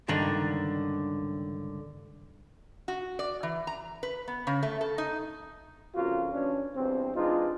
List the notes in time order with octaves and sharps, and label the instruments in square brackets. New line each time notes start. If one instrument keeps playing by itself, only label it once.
[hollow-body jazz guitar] C#2 G2 D3 D#3 D4 D#4
[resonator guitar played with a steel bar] F#4
D5
E3
A#5
B4
B3
C#3
A3
A4
D#4
[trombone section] F2 C#3 A#3 F4 F#4
E3 C#4 D4
E2 G2 B2 C4
E3 G#3 D4 D#4 F4